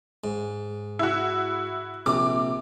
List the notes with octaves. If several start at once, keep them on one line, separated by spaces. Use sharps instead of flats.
G#2
E4 F#4
A#1 C3 D6